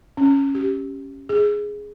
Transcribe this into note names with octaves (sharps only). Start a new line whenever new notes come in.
C#4
G4
G#4